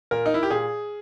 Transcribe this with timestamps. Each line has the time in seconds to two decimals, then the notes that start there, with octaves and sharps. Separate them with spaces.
0.11 A#2 A#4
0.26 D#4
0.34 E4
0.43 G4
0.50 A#2 G#4